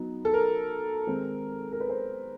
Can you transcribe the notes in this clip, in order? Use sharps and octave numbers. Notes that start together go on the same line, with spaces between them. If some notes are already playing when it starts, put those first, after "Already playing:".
Already playing: F#3 B3 D#4
A4
A#4
D#3 G#3 C4
A#4
B4
C5